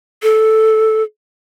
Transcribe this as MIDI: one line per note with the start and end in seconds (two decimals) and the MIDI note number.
0.23 1.03 69